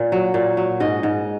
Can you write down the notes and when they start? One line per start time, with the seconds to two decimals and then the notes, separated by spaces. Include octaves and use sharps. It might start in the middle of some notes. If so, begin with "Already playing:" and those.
Already playing: A#2
0.12 F#3
0.34 A#2
0.57 F#3
0.80 G#2 D#5
1.03 G#2